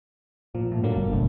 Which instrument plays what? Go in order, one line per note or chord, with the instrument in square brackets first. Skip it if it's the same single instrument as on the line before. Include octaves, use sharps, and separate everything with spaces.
[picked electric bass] A#2 [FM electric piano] F3
[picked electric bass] A2
[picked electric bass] G2 [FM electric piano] D3 F#3 A#3
[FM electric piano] G1
[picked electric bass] F1 B2 A3